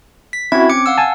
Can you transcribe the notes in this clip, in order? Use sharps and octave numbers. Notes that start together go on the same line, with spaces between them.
B6
C4 C#4 E4 F#4 G#6
D6 C#7
F5 F#5 E6
G#5 A5